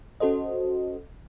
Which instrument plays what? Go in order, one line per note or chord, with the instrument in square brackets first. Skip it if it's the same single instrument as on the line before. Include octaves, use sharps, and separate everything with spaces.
[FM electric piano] C#4 F#4 A4 C5 D#5